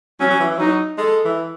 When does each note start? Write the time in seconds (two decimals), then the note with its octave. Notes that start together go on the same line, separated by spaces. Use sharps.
0.20 F#3 C#4
0.30 F#3
0.40 E3
0.51 E3
0.59 F#3 D#4
0.98 G#3 A4
1.25 E3